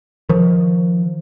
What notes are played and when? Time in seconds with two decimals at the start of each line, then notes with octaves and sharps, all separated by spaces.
0.29 D#3 F3